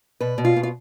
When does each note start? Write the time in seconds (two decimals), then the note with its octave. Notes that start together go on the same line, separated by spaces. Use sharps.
0.20 B2 B4
0.38 B2
0.45 F4
0.56 B2
0.63 F4